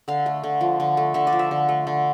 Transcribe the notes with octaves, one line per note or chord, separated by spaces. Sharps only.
D3 F5
A3
D3
F3
D3
A3
D3 E5
D5
F3
E5
D3
A3
D3